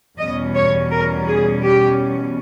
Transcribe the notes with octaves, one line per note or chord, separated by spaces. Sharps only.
E2 B2 G3 C#4 D#5
C#5
A#4
G#4
G4